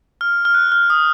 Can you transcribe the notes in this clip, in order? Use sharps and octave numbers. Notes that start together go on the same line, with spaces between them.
F6
F6
F#6
F6
D#6